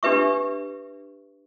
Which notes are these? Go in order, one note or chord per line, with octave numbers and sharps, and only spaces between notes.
D4 G4 B4 E5 C#6